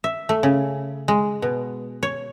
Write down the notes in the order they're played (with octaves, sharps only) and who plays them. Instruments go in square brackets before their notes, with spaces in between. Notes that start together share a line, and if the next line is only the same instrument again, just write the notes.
[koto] E5
A3
C#3
G#3
B2
C#5